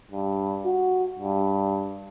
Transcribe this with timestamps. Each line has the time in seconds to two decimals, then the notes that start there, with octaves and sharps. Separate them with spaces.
0.11 G2
0.66 F#4
1.19 G2